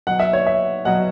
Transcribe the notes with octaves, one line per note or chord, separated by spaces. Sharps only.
B2 F#3 F#5
E5
C#5
E5
B2 F#3 F#5